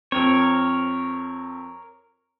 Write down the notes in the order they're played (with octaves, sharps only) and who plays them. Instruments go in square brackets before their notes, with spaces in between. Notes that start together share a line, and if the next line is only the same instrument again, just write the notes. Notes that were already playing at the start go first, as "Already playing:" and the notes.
[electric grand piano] F2 C4 [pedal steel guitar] A#4 C#5